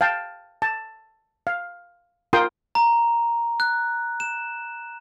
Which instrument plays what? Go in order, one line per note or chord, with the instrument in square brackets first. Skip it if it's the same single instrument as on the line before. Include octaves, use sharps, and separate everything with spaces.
[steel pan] F5 G5 A5
A5
F5
F4 A#4 G5 C6 D#6
[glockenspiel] A#5
F#6
E7